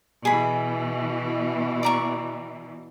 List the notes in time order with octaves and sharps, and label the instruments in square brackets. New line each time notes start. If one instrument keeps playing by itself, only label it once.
[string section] B2 E3 [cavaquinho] G#4 B5
[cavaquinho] D5 A#5 C#6